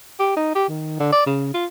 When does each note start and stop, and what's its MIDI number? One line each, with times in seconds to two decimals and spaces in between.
0.20 0.35 67
0.36 0.52 63
0.55 0.65 67
0.69 0.95 51
1.00 1.12 50
1.12 1.22 74
1.26 1.50 49
1.54 1.66 65